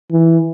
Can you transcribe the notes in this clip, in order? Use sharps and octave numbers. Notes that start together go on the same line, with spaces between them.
E3